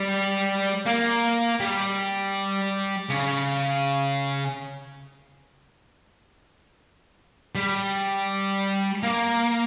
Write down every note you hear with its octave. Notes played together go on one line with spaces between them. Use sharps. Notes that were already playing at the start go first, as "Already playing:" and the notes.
Already playing: G3
A#3
G3
C#3
G3
A#3